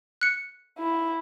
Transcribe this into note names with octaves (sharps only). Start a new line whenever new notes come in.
F#6 C#7
E4